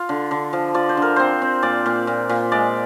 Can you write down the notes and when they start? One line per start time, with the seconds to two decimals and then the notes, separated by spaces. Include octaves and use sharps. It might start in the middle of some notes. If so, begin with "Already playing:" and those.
Already playing: F4
0.09 D3
0.31 D3
0.53 F3
0.74 F3 D5
0.89 C5
0.97 D3 A#4
1.16 C4 C5
1.42 C4
1.62 A#2 D5
1.86 A#2
2.07 A#2
2.29 A#2
2.52 G#3 D5